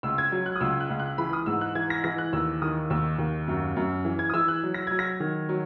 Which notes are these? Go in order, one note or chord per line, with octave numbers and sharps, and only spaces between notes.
C#2 E6
G#6
F#3
F#6
D#6
C#2 E6
F#6
C#2
F#6
E3 B5
D#6
G#2 E6
F#6
E3 G#6
A#6
E3 A#6
F#6
D#2 E6
D#3 D#6
D#2 E6
D#2
F#2
F#2
E3
G#6
D#6
E3 E6
F#6
F#3
A#6
F#3 G#6
A#6
D#3
F#3